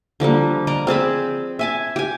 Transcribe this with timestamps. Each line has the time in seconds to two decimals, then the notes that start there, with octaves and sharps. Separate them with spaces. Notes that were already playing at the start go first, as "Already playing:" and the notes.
0.20 D3 F3 G3 A#3
0.67 A#4 D5 D#5 A#5
0.87 C4 G#4 A5 B5
1.59 E5 G#5 A5
1.96 G4 G#5